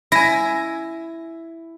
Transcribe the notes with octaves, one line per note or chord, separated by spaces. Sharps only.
E4 G#5 A#6